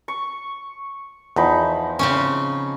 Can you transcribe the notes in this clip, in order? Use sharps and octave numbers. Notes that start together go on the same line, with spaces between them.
C#6
E2 F3 D#4 B5
C#3 C4 C#4